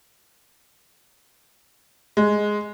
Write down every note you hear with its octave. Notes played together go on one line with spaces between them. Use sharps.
G#3